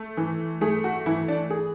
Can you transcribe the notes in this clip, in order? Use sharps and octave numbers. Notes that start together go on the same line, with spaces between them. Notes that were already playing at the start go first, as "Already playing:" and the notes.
Already playing: A3
E3
A3 G#4
F#4
E3 E4
D4
G#4